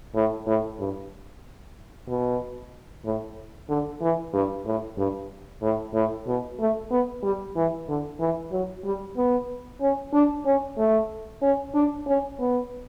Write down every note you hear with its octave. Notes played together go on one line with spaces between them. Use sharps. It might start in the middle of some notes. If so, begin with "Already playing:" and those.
A2
A2
G2
B2
A2
D3
E3
G2
A2
G2
A2
A2
B2
A3
B3
G3
E3
D3
E3
F#3
G3
B3
C#4
D4
C#4
A3
C#4
D4
C#4
B3